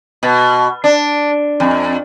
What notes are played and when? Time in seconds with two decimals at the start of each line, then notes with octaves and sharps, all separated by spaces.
0.23 B2
0.84 D4
1.60 F2